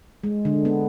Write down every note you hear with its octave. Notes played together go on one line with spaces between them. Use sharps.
G#3
D3
B3